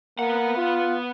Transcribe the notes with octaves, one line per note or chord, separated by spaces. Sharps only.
A#3 B3 F#5
F4